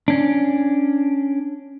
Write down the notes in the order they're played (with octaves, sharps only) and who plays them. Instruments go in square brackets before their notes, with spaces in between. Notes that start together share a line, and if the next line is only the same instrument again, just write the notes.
[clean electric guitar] C#4 D4